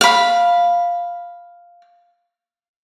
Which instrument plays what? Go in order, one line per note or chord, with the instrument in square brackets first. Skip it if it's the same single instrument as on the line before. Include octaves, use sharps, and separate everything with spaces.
[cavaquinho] F5 B5